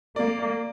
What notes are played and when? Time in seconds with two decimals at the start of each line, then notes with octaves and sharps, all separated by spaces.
0.16 A#3 D5
0.39 D5